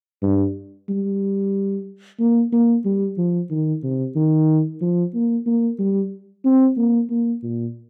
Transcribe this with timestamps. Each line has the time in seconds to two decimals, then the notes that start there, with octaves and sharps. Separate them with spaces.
0.22 G2
0.89 G3
2.20 A#3
2.52 A#3
2.85 G3
3.18 F3
3.50 D#3
3.83 C3
4.16 D#3
4.81 F3
5.14 A#3
5.46 A#3
5.79 G3
6.45 C4
6.77 A#3
7.10 A#3
7.43 A#2